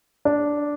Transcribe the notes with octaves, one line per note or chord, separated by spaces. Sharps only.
D4